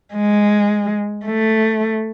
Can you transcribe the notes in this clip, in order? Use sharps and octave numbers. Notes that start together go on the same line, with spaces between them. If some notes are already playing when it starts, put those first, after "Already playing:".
G#3
A3